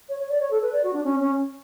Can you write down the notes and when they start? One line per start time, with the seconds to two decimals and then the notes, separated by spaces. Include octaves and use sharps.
0.09 C#5
0.19 C#5
0.29 D5
0.40 C#5
0.51 A4
0.62 B4
0.73 D5
0.83 F#4
0.93 D4
1.04 C#4
1.20 C#4